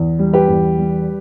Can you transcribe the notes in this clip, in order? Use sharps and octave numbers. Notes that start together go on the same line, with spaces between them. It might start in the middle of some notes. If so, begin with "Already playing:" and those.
Already playing: E2
G3
G4 B4
E2
G3